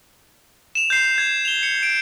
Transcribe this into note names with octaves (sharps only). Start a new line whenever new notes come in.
E7 F7
G6 C7
G#6
F7 G7
C#7
D7